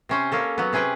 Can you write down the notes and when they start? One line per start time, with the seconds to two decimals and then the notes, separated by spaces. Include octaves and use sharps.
0.09 C3 C#4 C5
0.32 A#3 C#4 A4
0.58 F#3 B3
0.73 C3 C#4 G#4 B4 G5